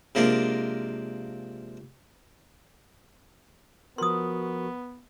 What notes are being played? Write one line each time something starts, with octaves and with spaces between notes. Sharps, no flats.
C3 F3 G#3 A#3 D4
F3 B3 F#4 A#4 C6 D#6